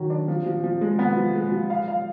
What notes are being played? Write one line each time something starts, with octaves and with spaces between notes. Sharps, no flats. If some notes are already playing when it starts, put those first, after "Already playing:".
Already playing: D#3 F#3
D4
F3
F3
F3
G#3
B3
F3
G#3
F3
F5
F5